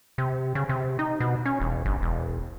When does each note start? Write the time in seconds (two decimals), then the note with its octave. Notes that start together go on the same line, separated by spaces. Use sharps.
0.18 C3
0.55 C#3
0.69 C3
0.99 D#4
1.20 B2
1.45 C#4
1.60 E1
1.85 G1
2.02 E1